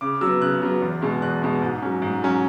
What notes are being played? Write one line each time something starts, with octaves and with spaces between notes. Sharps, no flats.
C#3 D6
F#3 B3 E6
C#3 F#6
F#3 B3
E2
B2 G#3
E2 F#6
B2 G#3
G#2
F#3 C#4
G#2
F#3 C#4